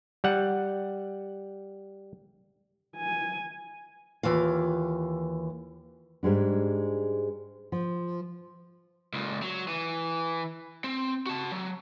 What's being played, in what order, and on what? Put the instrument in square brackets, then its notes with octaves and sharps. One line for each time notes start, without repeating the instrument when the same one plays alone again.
[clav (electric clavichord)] G3 F#5
[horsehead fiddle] G#5
[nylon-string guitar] D#2 G#2 E3 F4 F5
G#2 G3 G#3 D4
F3
[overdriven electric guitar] C#2 A#2
F#3
E3
C4
F#4 A5
F#3